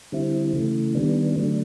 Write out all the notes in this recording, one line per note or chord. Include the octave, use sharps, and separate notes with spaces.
D3 G3 C4 E4
C#3 E3 A3
D#3 G3 B3 D4
D3 F#3 A3 D4